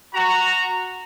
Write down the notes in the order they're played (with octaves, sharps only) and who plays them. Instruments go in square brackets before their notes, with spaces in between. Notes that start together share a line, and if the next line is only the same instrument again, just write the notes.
[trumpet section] F#4 A#5